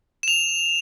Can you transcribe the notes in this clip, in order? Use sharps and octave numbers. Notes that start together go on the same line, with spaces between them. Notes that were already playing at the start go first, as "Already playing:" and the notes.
E7 F7